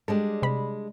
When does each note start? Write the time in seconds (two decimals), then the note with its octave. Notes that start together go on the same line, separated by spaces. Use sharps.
0.08 G3 G#3 D4 A4
0.42 C3 B5